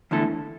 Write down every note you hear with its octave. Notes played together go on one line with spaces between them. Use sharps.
E2 D3 A3 E4 A4